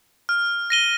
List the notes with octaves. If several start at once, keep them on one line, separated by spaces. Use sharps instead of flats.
F6
A#6 D#7 G7